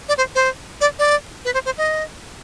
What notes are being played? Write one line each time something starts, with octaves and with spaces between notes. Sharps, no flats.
D5
C5
C5
D5
D5
B4
C5
C5
D#5